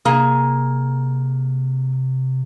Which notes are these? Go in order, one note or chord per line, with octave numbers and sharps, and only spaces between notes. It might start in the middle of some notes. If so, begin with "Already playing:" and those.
C3 A#3 G#4